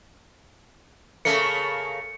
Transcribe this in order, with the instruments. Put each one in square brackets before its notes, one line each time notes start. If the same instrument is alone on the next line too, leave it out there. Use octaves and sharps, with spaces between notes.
[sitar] C#3 A3 A#3 [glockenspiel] C#7